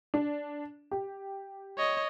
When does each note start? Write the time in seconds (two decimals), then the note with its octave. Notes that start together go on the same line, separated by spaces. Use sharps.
0.14 D4
0.91 G4
1.78 C#5 D#5